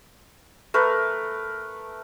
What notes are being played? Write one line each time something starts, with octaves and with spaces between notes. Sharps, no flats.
A3 A#4 B4